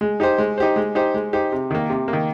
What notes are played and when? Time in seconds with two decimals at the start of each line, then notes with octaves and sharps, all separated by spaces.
0.01 G#3
0.20 D#4 G4 C5
0.38 G#3
0.58 D#4 G4 C5
0.76 G#3
0.95 D#4 G4 C5
1.14 G#3
1.33 D#4 G4 C5
1.52 C3
1.71 D#3 A#3
1.90 C3
2.08 A#3
2.13 D#3